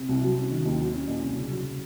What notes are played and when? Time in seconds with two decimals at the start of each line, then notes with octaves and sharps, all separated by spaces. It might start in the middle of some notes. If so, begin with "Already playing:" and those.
Already playing: C3
0.09 C2
0.23 F#3
0.37 C#4
0.51 D#3
0.65 D#2
0.80 F#3
0.93 C#4
1.08 A#2
1.22 C2
1.37 C#3
1.50 F#3